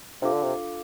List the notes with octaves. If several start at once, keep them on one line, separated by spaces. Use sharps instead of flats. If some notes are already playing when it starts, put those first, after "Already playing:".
C3 D4 F4 A4 F5 D6
D3
C3